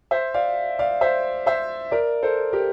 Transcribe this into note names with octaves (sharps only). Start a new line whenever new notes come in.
C5 E5
D5 F5
D5 F5
C5 E5
C5 E5
A#4 D5
A4 C5
G4 A#4